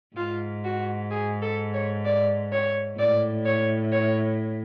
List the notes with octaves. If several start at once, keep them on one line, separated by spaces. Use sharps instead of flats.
G#2 F4
F#4
G#4
A4
C#5
D5
C#5
A2 D5
C#5
C#5